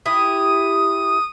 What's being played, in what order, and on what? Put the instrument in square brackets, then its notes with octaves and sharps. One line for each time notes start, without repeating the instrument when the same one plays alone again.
[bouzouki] E4 G4 [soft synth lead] D#6